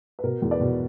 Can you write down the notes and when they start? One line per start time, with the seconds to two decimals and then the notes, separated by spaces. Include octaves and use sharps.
0.19 B4
0.24 B2 A#4
0.42 E2
0.51 B4 D5
0.60 B2